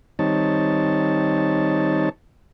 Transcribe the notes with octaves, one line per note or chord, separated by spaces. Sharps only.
D#3 G3 C4 D#4 C#5 A5